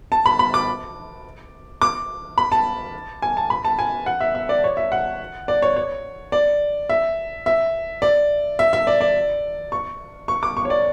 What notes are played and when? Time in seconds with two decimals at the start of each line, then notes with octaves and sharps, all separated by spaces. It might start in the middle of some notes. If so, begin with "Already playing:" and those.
0.12 A5
0.26 B5
0.39 B5
0.54 D6
1.82 D6
2.38 B5
2.52 A5
3.22 G#5
3.37 A5
3.50 B5
3.65 A5
3.79 G#5
4.06 F#5
4.21 E5
4.35 E5
4.49 D5
4.64 C#5
4.77 E5
4.92 F#5
5.48 D5
5.62 C#5
5.77 C#5
6.32 D5
6.89 E5
7.46 E5
8.02 D5
8.59 E5
8.73 E5
8.87 D5
9.01 D5
9.72 C#6
10.28 C#6
10.43 D6
10.57 C#6
10.65 C#5
10.70 D5